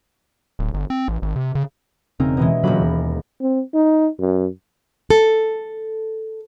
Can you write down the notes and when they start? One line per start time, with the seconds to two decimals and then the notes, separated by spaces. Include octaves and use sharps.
0.59 D1
0.74 G1
0.90 C4
1.08 A1
1.22 G#1
1.36 C3
1.55 C#3
2.20 E1 C#3 C4 C#4 D#4 A#4
2.37 B2 E3 G#3
2.63 E1 A#2 D3 F#3 A#3 B5
2.81 D#2
3.41 C4
3.74 D#4
4.19 F#2
5.10 A4